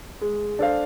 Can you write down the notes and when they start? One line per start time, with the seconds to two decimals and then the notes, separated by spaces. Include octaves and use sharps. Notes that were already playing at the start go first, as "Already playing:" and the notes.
0.21 G#3
0.59 D4 A4 C5 F5